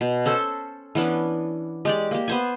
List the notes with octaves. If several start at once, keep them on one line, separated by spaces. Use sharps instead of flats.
B2
C#4 A4 C5
E3 B3 C#4 D4
G#3 G4 D5
A#3 G4
B3 C5 G#5